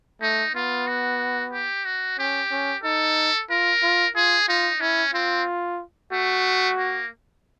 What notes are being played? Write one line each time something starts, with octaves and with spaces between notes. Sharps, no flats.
A3 D#4
B3 F4
F#4
G4
F#4
C#4 G4
C#4
D#4 A4
F4 A#4
F4
F4 G#4
D#4 F4
C#4 E4
C4 F4
A3 F#4
A#3